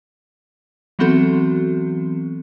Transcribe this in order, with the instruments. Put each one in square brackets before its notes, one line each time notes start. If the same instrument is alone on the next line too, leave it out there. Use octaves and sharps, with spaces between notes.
[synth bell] E3 F#3 B3 C4 F#4 A4